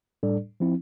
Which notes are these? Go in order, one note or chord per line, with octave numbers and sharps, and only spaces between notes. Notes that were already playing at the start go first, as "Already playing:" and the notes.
A2 G3 D4 A4 D5
F3 C4 E4